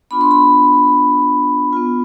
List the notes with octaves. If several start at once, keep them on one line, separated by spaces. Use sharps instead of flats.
B3 D4 F4 B5
C6
B5
B3 F4